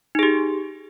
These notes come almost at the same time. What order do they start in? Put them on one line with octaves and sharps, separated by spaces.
D#4 G#4 G4